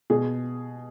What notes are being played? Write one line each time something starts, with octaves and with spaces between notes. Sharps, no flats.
B2 G#4